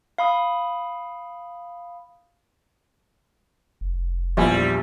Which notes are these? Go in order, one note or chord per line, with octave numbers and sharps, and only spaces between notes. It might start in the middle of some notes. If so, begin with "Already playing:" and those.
F5 B5 D#6
F1
A#1 E2 G3 G#5